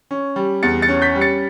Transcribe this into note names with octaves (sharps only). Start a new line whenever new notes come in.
C#4
G3
E2 A6 C#7
A6 C#7
C#4
G6 B6
G3
A6 C#7